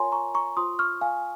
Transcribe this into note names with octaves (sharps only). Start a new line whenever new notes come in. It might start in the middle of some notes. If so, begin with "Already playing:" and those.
Already playing: F4 A#4 C#5 G#5 A#5 C6
A#5 C#6
A#5 C#6
F4 C5 C6 D#6
C#6 F6
F5 G#5